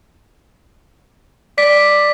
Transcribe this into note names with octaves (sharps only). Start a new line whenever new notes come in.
D5 B6